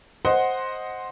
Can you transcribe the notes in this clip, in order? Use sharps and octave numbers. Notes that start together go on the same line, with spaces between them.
C5 D#5 F#5 C6